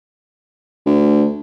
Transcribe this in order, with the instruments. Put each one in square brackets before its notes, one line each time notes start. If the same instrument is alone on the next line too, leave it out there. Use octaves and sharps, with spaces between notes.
[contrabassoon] D2